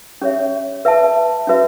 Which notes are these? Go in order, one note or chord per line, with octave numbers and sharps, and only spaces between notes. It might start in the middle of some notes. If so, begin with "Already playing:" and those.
C#4 G4 C#5 E5
B4 E5 A5
C#4 F#4 B4 E5